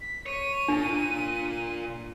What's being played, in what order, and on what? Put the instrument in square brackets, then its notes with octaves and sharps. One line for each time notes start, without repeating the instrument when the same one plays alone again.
[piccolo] B6
[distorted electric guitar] C#5 [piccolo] D#7
[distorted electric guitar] A#2 [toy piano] D4